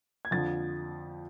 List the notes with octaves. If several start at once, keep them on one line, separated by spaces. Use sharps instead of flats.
G#6
F2 D3 F3 A6